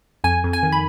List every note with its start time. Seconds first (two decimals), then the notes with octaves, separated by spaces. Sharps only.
0.24 F2 G#5
0.44 F2
0.53 G#5
0.63 D#3
0.72 B5